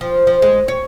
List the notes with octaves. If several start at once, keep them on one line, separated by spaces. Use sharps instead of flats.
F3
F3
G#3
C#5